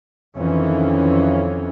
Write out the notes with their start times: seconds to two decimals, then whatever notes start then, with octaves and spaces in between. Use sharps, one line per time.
0.36 F2 D#3 E3 C#4